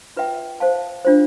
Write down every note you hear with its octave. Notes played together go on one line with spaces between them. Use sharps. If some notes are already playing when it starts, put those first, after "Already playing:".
F4 B4 E5 G5
C5 F5 A5
D4 F4 C5